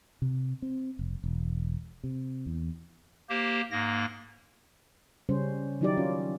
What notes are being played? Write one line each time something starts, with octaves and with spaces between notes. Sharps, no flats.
C3
C4
F1
E1
C3
E2
A#3 G4 C5
G#2 A#3 A#6
C#3 G3 C#4 C5
D#3 F#3 D#4 E4 G4 D5
C#4 F4